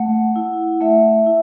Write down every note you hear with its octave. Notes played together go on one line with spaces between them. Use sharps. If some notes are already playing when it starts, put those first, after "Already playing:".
Already playing: A3 F#5
E4
A3 E5
E4